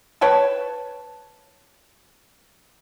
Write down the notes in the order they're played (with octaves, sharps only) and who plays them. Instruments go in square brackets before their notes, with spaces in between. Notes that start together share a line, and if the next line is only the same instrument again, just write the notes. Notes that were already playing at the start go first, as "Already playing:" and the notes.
[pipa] B4 C#5 G5 A5